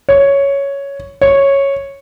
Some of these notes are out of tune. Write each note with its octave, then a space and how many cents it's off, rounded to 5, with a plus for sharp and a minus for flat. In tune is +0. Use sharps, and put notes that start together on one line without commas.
C#5 +5
C#5 -5